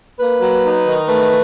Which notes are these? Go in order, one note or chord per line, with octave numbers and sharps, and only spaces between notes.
A#3 B4
F#3
D#4
D#3
A3 B4